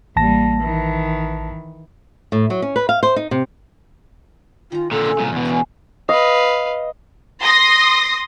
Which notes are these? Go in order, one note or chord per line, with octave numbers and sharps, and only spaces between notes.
A1 G3 A#3 A5 A#6
D#3 E3
A2
F#3
C#4
B4
F5
C5
D#4
C3
D#3 F4 A#5
A#2 D3 A4
C#3
C2 A#2
E2 B2 B3
G#4 B4 A5
B4 D#5 F5
C6 D#6 A#6